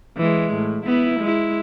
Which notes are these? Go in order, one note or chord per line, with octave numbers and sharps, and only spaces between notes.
E3 G#3
A2
B3 E4
G#3 E4